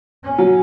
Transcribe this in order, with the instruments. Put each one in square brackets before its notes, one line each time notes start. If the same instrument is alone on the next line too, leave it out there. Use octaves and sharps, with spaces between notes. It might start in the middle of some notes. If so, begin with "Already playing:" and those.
[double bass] C#4
[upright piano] F#3